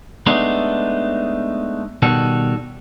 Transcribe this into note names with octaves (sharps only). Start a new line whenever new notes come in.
G#3 A3 B3 D4 D#4
B2 D#3 G3 F#4 A4